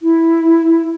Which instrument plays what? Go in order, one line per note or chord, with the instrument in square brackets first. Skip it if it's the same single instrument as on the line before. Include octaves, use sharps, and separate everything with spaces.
[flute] E4